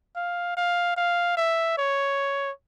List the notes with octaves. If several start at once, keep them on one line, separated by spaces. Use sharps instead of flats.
F5
F5
F5
E5
C#5